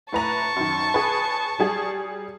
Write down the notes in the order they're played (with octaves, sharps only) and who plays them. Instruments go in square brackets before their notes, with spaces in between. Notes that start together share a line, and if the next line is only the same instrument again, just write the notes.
[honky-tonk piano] A2 B4 A#5 [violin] A5 C#6
[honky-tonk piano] F#2 D#3
G#4 B4
F#3 G3 G#4